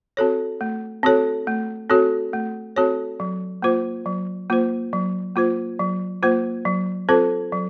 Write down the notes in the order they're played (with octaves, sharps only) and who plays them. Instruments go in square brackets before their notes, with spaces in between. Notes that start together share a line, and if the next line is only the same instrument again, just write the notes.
[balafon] C4 F#4 A4 C#5
A3
C4 F#4 A4 C#5
A3
C4 F#4 A4 C#5
A3
C4 F#4 A4 C#5
F#3
A#3 F4 C5
F#3
A#3 F4 C5
F#3
A#3 F4 C5
F#3
A#3 F4 C5
F#3
C4 F4 A4 C5
F#3